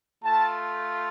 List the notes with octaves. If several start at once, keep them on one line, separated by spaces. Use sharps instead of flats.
A3 F4 A5